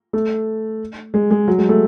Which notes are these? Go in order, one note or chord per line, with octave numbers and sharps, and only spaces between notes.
A3
G#3
G#3
F#3
G#3
A3